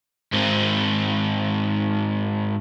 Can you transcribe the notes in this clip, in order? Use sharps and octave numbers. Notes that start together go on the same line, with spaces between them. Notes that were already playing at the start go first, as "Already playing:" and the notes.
G#2 C4